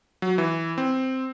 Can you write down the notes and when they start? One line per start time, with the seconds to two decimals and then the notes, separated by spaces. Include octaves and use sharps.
0.22 F#3
0.38 E3
0.78 C4